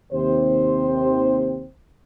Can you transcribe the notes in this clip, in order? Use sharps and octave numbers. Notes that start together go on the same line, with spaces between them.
D#2 C3 C4 C5